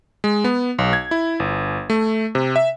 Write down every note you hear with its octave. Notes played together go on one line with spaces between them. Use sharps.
G#3
B3
B1
G#6
E4
G1
A3
C3
E5